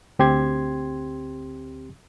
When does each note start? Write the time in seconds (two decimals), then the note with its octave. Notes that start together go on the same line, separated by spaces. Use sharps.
0.19 D2 C4 G4 C6 G#6